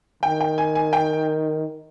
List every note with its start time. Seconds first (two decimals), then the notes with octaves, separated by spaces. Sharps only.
0.23 D#3 G5
0.40 G5
0.58 G#5
0.75 G#5
0.93 G5